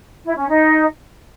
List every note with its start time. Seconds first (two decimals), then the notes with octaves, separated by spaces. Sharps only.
0.25 E4
0.37 C#4
0.49 D#4